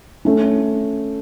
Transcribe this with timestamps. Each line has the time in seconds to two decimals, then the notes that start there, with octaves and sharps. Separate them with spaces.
0.25 A3 C#4